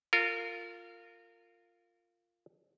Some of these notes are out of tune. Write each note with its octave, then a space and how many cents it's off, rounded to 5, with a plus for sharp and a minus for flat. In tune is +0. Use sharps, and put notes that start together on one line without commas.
F4 +0 A#4 -30